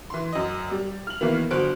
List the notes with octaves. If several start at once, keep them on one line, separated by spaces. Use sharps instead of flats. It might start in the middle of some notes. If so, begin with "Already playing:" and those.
E3 C6
F#2 D#5
G3
F6 F#7
D#3 E3 A#3 B3
G1 F#3 C5 F#6 D7